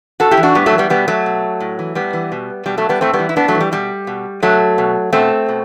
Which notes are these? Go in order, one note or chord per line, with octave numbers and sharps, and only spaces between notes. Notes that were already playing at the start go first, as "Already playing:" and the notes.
A2 F#4 A4
E4 G4
E3
D4 F#4
A2 G3 B3
F#3 A3
E3
G3 B3
B2 G3 B3
F#3 A3
B2
A2
E3
A2 G3 B3
E3
B2
B2 G3
F#3 A3
G3 B3
A2 A3 C4
G3 B3
E3
E4
A2 B3 D4
F#3 A3
E3
G3
B2 G3
B2
B2 F#3 A3
B2
B2 A3 C4
B2